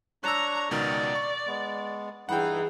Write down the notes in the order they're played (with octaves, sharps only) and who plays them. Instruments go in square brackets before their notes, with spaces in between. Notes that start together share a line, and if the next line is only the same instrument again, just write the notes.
[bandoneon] D4 C#5 C#6 [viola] A#5 [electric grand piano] E6 F#6
[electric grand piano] C#2 B2 D#3 [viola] D5 [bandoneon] A#5
[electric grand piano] C#6
[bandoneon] G#3 B3
[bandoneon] G2 D#4 E4 [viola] E3 G#4 [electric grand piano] F#5 G5